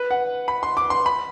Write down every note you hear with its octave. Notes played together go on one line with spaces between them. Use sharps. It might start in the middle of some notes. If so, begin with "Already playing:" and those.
Already playing: B4
F#5
B5
C6
D6
C6
B5